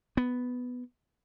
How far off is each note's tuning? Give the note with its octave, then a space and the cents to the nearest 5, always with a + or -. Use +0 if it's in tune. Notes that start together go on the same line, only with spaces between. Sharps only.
B3 +5